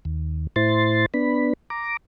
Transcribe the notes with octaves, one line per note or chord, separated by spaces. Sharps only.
D#2
A2 E4 C5 C6 A6
B3 D4 B5
A#5 D6